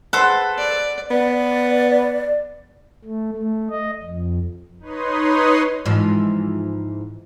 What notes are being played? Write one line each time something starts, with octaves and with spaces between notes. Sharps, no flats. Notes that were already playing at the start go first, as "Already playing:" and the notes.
A4 B4 C5 F#5
D5
B3 D5
A3
A3
D#5
F2
D#4 B4 C#5 C6 D#6
G#2 E3 F3